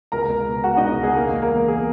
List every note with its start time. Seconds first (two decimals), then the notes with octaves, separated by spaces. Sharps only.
0.12 C#2 A#4 A#5
0.29 C#2
0.47 B2
0.64 G#3 F#4 F#5
0.77 C#2 D#4 D#5
0.99 C#2 G#4
1.16 E1 A#3 A#4
1.34 G#3
1.42 A#3 A#4
1.52 E2
1.68 B2 G#4